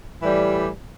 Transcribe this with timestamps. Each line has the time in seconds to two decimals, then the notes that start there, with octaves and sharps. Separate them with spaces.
0.21 A2 E3 G3